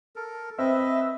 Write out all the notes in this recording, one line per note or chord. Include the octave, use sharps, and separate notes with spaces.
A4 A#4
C4 B4 D#5 E5